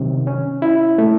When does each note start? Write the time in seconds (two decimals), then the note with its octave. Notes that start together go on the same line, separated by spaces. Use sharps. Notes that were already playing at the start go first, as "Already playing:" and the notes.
Already playing: C3 D#3 F#3 C#4
0.27 C#4
0.62 E4
0.98 A3